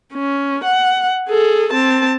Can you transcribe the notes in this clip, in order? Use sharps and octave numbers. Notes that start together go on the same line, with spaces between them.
C#4
F#5
G#4 A4
C4 A5